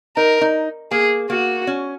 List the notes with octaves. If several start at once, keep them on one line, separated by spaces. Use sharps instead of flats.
D#4 A#4
D#4
A#3 G#4
A#3 F#4
C#4